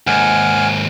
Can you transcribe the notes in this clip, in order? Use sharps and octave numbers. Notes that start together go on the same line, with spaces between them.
D#2 G#2 F#5 G#5 F6